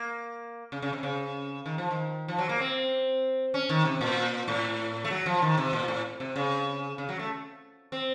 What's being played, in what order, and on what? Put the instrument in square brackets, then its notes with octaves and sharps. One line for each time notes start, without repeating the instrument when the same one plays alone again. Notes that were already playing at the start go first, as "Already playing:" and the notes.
Already playing: [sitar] A#3
C#3
C#3
C3
C#3
D#3
F3
D#3
F3
F#3
A#3
C4
C#4
D#3
C3
A#2
A2
A3
F#3
F3
D#3
C3
A#2
A2
C3
C#3
C#3
F#3
A3
C4